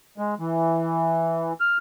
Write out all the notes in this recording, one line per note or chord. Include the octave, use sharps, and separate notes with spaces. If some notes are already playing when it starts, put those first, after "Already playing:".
G#3
E3
F6